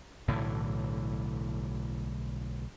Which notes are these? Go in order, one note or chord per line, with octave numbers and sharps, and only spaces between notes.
B1 A2 D3 E3